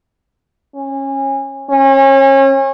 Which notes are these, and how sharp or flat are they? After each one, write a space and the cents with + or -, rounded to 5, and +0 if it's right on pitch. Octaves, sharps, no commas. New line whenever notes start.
C#4 -25
C#4 -35